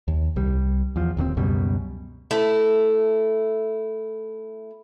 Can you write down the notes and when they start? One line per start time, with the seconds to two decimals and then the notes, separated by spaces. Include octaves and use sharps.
0.08 D#2
0.36 C2 G3
0.96 E2 F3
1.17 D1 D#2 D#3 C4
1.37 C#2 F#2 B2 G3
2.31 A3 E4